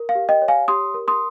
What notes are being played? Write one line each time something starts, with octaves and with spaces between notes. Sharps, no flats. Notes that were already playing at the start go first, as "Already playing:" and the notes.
Already playing: A#4
F5
G4
D#5 G5
C#5
F5 G#5
G4 C6 D#6
A#4
C6 D#6